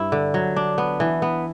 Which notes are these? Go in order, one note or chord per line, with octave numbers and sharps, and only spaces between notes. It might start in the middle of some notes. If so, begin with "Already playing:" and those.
Already playing: G2 E4
D3
F#3
D4
B3
E3
B3